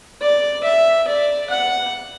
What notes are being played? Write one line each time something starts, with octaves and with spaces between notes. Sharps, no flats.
D5
E5
D5
F#5